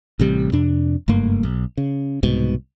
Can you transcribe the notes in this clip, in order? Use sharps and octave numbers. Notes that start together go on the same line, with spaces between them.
A1 C3 G3
F2 C3 D4
F#1 G2 A3 A#3
B1
C#3
C2 G#2 B2